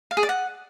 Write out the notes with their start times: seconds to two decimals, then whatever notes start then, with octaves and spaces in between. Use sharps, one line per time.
0.11 F5
0.17 G#4
0.23 D5
0.29 F#5